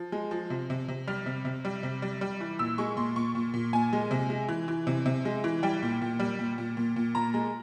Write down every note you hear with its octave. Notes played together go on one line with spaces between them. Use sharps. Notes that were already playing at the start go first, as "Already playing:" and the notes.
Already playing: F3
G#3
F3
C3
C3
C3
G3 F6
C3
C3
G3
C3
G3
G3
E3
A#2 E6
G#3 C#6
A#2 C6
A#2 C#6
A#2
A#2
A#2 G#5
G#3
C3
G#3
E3
E3
C3
C3
G#3
E3
G3 G5
A#2
A#2
G3
A#2
A#2
A#2
A#2
A#2 A#5
G#3